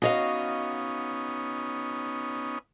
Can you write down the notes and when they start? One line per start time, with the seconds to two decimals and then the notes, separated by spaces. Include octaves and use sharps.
0.02 B3 C#4 D#4 F#4 D#5 F5